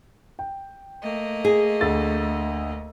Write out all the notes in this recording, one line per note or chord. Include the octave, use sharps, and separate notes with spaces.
G5
A3 A#3 D#5
G#4
D2 E6 A6